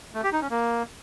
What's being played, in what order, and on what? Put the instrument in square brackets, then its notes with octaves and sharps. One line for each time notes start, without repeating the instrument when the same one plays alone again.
[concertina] A3
G4
D#4
C#4
A#3